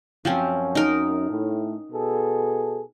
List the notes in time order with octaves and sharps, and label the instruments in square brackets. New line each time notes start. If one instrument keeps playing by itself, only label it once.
[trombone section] F#2 [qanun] F3 C4 C#4
[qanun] D#4 A#4
[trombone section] A2
B2 G#4 A4